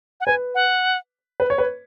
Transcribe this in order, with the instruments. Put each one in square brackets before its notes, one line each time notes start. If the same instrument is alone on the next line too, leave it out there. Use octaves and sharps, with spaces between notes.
[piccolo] F#5
[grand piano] B4 [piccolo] G#5
[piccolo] F#5
[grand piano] B4
C#5
B4